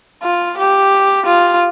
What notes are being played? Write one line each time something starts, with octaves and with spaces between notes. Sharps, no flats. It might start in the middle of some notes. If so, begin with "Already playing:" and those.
F4
G4
F4